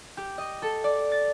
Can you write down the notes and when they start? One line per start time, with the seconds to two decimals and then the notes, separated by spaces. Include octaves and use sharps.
0.17 G4
0.38 D#5
0.62 A4
0.84 D5
1.12 A6